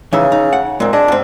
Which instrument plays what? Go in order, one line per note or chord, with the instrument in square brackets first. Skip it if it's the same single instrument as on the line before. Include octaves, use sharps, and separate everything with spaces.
[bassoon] C#3 [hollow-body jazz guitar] E3 D#4 E5
[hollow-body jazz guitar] D#4
F#5
[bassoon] A#2 [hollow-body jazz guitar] G#3 C4
[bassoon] D4 [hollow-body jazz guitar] G#4 D#5 E5
[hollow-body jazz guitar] G#2 C4